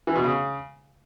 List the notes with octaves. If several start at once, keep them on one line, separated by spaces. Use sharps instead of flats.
E3
B2
C#3